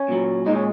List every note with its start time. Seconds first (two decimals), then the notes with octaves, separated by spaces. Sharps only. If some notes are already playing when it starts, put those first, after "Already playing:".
Already playing: C#4
0.08 A#2 F#3
0.46 A#2 G#3 D#4
0.55 C#4